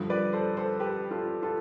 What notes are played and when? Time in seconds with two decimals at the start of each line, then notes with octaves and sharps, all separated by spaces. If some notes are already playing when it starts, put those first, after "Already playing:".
Already playing: G2 D3 F3
0.10 B4 D5
0.33 A4 C5
0.57 A4 C5
0.80 G4 B4
1.11 F4 A4
1.42 F4 A4